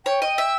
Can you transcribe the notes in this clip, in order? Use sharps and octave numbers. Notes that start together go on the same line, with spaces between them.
C#5 G5
D#5
E5